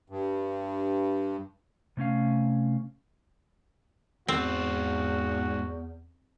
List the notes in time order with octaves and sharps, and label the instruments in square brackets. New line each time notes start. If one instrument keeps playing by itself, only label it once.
[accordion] G2
[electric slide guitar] C3 A3 C#4 F5
[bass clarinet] E2 [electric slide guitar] G#2 C5 D5 [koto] C4 [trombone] F#4